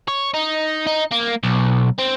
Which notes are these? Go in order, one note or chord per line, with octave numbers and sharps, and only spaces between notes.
C#5
D#4
D#4
A#3
B1
C4